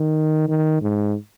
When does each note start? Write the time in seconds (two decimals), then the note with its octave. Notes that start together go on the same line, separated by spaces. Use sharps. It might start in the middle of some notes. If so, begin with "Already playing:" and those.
Already playing: D#3
0.49 D#3
0.81 G#2